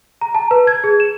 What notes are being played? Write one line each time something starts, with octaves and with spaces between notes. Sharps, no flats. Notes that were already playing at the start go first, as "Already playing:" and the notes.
A#5
A5
B4
G#6
G#4
E7